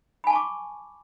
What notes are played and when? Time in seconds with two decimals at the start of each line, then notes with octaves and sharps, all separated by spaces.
0.24 B5
0.27 G#5
0.30 A5
0.33 C#6
0.36 D6